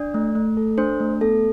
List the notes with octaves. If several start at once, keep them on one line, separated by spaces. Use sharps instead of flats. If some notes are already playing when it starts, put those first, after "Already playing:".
Already playing: D4 D5
A3
A3
A4
D4 C5
A3
B3 A4